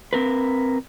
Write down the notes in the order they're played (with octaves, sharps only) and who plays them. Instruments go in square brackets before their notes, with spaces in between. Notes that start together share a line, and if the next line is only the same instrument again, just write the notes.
[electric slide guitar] C4 A#4 B4